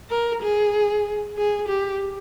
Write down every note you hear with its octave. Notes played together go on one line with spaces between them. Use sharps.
A#4
G#4
G#4
G4